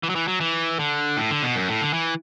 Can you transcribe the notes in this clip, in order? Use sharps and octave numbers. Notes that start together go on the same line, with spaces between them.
E3
F#3
E3
F#3
E3
D3
A2
D3
B2
F#2
A2
D3
E3